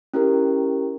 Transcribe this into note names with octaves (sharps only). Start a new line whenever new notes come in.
C#4 E4 G4 A#4